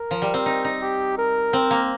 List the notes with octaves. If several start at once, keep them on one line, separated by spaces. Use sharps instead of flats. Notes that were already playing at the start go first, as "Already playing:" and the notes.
Already playing: A#4
F3
G3
C4
D#4
D#4
G4
A#4
C4
A#3